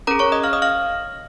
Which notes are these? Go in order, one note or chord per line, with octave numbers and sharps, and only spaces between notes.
C#4 G#4 A#4 A#5
C#5 C#6
D#5 D#6
F5 F6
D#5 D#6
F5 F6